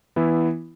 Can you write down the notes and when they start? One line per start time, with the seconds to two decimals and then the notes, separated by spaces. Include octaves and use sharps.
0.16 E3 B3 E4